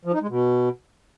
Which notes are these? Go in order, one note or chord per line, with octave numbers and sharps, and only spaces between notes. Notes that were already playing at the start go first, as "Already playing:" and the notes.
F3
D#4
G#3
B2